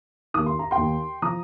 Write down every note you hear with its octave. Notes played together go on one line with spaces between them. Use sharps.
D#2 D#3 D#6
C6
A#5
G5 C6
D#2 D#3
F3 A#5 D#6